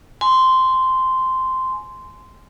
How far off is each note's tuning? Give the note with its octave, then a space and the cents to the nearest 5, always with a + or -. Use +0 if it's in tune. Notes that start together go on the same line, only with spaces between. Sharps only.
G#5 +20 C6 -10